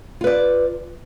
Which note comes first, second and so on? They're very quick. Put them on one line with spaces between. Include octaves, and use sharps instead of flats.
F4 B4 D5